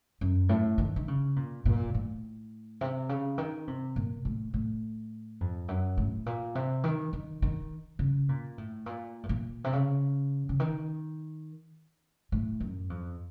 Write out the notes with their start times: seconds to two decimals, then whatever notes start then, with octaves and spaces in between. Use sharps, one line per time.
0.21 F#2
0.49 A2
0.78 D#3
0.96 D#3
1.08 C#3
1.36 A#2
1.65 A#2
1.94 A2
2.81 C3
3.09 C#3
3.38 D#3
3.68 C3
3.96 A#2
4.25 A2
4.54 A2
5.41 F2
5.68 F#2
5.97 A2
6.26 A#2
6.55 C3
6.84 D#3
7.13 D#3
7.42 D#3
7.99 C#3
8.29 A#2
8.58 A2
8.86 A#2
9.23 A2
9.29 A#2
9.64 C3
9.73 C#3
10.49 C#3
10.60 D#3
12.32 A2
12.60 F#2
12.90 F2